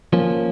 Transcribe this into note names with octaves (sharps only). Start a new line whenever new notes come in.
F3 A#3 C#4